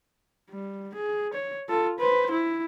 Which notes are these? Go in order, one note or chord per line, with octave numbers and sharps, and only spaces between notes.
G3
G#4
C#5
F4 A4
B4 C5
E4